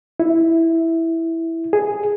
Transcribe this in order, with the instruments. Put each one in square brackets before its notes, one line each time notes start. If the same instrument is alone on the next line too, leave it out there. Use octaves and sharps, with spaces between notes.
[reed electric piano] E4
G#4